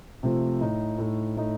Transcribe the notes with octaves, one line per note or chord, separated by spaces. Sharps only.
C3 F3 A3
A2 A3 D#4
A2 A3 D#4
A2 A3 D#4